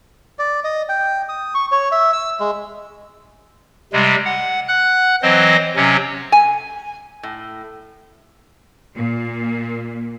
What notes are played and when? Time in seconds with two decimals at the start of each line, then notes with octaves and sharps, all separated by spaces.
0.39 D5
0.64 D#5
0.89 G5
1.29 D#6
1.55 C#6
1.72 C#5
1.92 E5
2.13 E6
2.40 G#3
3.93 C3 G3 G#3
4.25 F#5
4.68 F#5 F#6
5.22 E3 F#3 C4 C5 D#5
5.76 C3 F#3 C#4
6.32 G#5
7.23 A2
8.96 A#2